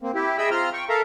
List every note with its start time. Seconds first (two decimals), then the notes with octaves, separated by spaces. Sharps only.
0.02 A#3 C4
0.15 E4 G4
0.38 G#4 D#5 E5 G5 B5 E6
0.51 C4 F4 A#5 C6 F6
0.73 G5 C#6
0.89 A4 A#4 E5 F5 A#5